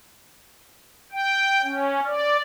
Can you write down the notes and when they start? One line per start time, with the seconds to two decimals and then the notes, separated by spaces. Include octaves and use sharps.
1.12 G5
1.62 C#4
2.06 D5